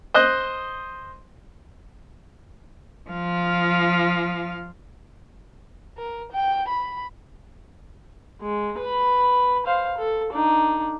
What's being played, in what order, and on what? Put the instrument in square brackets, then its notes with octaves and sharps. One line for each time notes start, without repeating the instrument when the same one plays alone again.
[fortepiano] C5 D#5 F#6
[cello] F3 F5
[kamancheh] A#4
G5
B5
[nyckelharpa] G#3
B4 B5
C5 F5
A4
D4 D#4